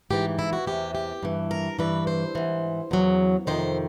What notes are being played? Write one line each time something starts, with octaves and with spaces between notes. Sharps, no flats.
G#2 E3 G4
E4
F#4
E2 C3 E3 G4
G4
G2 E3
A#4
G2 E3 B4
C5
G#2 E3
E2 C#3 F#3
F2 C3 D#3 C5